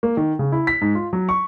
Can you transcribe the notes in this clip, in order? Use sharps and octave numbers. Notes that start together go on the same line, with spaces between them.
A#3
D#3
C#3
E4
B6
G#2
F4
F#3
C#6